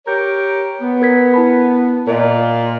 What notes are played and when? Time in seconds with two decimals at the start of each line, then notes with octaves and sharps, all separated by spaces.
0.07 G4 A#4 C#5 G6
0.81 B3
1.02 A#4 G#6 B6
1.34 E4 A5 B5
2.07 A#2 F4 A#4 D#5